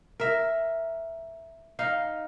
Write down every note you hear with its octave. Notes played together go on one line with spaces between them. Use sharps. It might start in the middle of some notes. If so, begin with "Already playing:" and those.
A#4 E5
D#4 F5